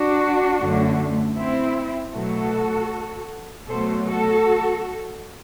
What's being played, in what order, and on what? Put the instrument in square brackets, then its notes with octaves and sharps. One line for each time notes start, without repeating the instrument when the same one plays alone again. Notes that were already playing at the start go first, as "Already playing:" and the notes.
Already playing: [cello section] D4 F#4
F#2 D3 A3
C4 E4
B2 F#3 A3 F#4 A4
B2 F#3 A3 A4 C5
F#4 A4